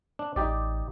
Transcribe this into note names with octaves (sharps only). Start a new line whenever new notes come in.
D4
A1 D#4 G4 D5